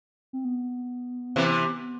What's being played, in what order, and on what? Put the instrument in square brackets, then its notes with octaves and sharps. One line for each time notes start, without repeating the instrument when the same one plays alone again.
[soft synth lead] C4
B3
[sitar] C3 E3